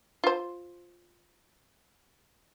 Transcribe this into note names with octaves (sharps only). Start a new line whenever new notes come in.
F4 C5